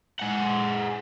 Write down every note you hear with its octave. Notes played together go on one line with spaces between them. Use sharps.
G#3 F#5